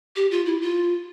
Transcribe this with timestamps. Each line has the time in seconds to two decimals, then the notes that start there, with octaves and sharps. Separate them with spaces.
0.16 G4
0.31 F4
0.46 E4
0.61 F4